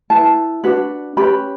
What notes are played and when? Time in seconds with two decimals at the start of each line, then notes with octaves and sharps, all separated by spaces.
0.10 E4 B4 A5
0.64 D4 F#4 B4
1.17 C#4 G4 B4 B5